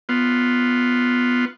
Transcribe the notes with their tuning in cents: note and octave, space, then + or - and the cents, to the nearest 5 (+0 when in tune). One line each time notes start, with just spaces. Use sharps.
B3 +0 F4 +0